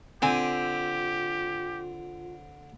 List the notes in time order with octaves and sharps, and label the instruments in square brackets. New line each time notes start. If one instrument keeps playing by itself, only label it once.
[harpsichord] D3 [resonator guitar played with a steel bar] C4 G#5 [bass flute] F4 [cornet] G4